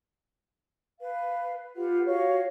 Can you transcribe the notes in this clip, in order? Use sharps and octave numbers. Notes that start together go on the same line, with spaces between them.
B4 F5
F4 G4 B4 F#5
F#4 C#5 F5